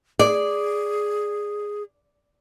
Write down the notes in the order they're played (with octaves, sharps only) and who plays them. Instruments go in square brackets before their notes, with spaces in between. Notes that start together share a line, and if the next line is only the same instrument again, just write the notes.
[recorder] G#4 [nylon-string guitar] D5